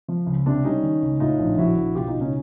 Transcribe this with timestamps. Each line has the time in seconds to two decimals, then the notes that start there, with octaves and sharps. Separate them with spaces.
0.08 F3
0.26 C#2
0.46 C3 C4 D4
0.65 G3 C#4 D#4
0.83 D#3
1.02 C#2
1.20 A2 D#4 F4
1.39 A#1
1.58 F3 E4 F#4
1.77 A#1
1.95 B2 F4 G4
2.08 D#4 F4
2.15 C#2
2.21 C#4 D#4